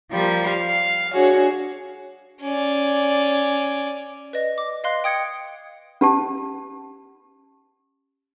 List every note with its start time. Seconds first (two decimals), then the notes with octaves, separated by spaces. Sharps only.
0.11 F3 G3 A#3
0.49 F5
1.13 D4 F#4 G#4 C#5
2.42 C#4 D5
4.33 B4 D5 D#5
4.58 D6
4.84 D#5 F5 C6 F#6
5.04 G5 D#6 G#6 C#7
6.01 C#4 G4 A5